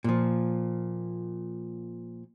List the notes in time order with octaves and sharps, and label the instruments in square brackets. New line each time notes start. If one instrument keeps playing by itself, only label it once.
[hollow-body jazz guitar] A#2 F3